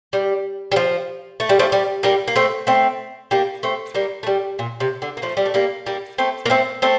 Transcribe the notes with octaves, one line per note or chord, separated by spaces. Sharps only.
G3
G3
F3
A3
G3
F3 A3
G3
G3 A#3
A#3
A3 C4
A3 C4
G3 A#3
A3 C4
G3 A#3
A3
G3
A#2
C3
D3
A#3
F3 A3
G3
A3
G3 A#3
G3 A#3
A3 C4
A#3
A3 C4
A3 C4